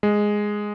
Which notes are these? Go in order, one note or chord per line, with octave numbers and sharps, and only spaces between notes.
G#3